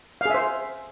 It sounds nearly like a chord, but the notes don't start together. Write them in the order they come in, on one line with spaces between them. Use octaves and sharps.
F5 G#4 E5 C5